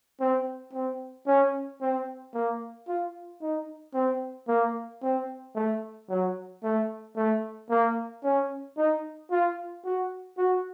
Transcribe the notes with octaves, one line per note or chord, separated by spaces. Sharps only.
C4
C4
C#4
C4
A#3
F4
D#4
C4
A#3
C4
A3
F#3
A3
A3
A#3
C#4
D#4
F4
F#4
F#4